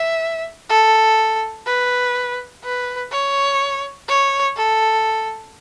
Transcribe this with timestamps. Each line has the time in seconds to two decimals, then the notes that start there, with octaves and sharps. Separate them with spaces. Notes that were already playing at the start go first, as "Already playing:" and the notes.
Already playing: E5
0.69 A4
1.66 B4
2.64 B4
3.12 C#5
4.08 C#5
4.57 A4